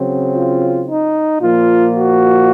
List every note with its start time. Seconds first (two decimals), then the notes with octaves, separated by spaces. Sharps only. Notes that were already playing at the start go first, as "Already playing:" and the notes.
Already playing: C#3 F#3 C4
0.35 F4
0.89 D#4
1.42 A#2 F3 A#3 F4
1.96 F#4